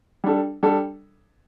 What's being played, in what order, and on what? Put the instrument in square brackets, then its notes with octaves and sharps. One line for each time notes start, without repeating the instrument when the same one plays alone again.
[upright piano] G3 D4 A4
G3 D4 A4